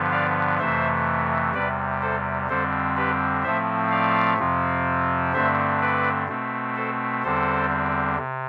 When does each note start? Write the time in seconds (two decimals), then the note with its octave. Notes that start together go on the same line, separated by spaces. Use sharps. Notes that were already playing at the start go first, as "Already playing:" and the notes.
Already playing: G2 D3 F3 B3
0.12 D5 F5
0.59 F2 C3 E3 A3 C5 E5
1.54 E2 C3 G3 B4 D5
2.02 A4 C5
2.49 F2 D3 G3 C4 A4 C5
2.97 G4 B4
3.43 A2 F3 A3 C4 C5 E5
3.91 D5 F5
4.39 F2 C3 F3 C4
5.33 G2 D3 A3 C4 C5 E5
5.81 B4 D5
6.28 B2 A3 C4
6.76 A4 C5
7.23 E2 D3 G3 C4 A4 C5
8.18 C3